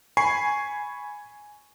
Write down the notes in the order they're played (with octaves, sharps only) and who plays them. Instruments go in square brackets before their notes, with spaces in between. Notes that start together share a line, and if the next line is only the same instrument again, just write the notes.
[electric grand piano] G#5 B5 C#6 C7